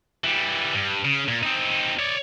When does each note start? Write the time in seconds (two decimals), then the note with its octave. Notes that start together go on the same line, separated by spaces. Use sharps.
0.24 E3 G3
0.75 G2
1.05 C#3
1.28 A#2
1.43 C4 D#4
1.99 C#5 D5